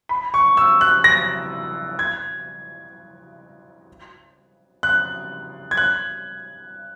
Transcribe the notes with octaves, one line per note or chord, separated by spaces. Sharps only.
B5
C#6
E6
F#6
A#6
G#6
F#6
G#6
F#6